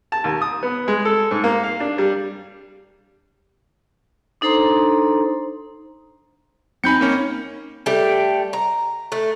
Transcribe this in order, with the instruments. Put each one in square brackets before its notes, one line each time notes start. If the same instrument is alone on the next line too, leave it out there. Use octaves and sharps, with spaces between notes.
[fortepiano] A5
D#2
D#6
B3
G#3
A4
G#2
A#3
F5
D4
G3
[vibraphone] D4 D#4 A4 C5 A#5 C6
[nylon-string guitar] C4 D#4 G#5 [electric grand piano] B5 G6 C#7
[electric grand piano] A#3 C#4
[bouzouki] G3 A3 G4
A#5
A3